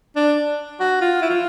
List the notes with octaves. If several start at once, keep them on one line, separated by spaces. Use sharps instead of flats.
D4
F#4
F4
E4
F4